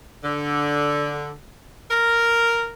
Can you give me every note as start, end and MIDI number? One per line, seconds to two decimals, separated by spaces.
0.24 1.33 50
1.91 2.72 70